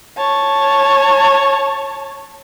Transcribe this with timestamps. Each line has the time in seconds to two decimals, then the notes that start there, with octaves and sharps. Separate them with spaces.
0.17 C#5 A5